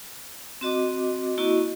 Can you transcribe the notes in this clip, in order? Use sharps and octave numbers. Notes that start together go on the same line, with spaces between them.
C4 F#4 D#5 D6
A#3 E4 F#4 D#5 C#6